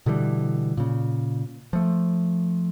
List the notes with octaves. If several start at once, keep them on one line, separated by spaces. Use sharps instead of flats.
B2 D3 E3 G3
A#2 C#3
F3 A3